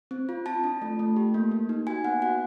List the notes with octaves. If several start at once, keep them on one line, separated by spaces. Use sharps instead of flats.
C4
F4
F4 A5
D4
A3
A3
G4
A#3
A#3
D#4
F#4 G#5
B3 F#5
F#4 F#5